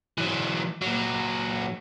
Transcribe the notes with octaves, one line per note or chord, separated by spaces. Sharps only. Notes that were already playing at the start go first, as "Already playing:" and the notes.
E3 F#3
A#2 F#3